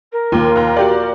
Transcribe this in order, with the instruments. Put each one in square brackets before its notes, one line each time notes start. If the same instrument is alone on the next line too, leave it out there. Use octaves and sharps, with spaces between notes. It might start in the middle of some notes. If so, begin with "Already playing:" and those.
[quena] A#4
[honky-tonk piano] D#2 [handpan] A#3 F4
[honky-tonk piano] D#2 A#5
F#4 G4 D5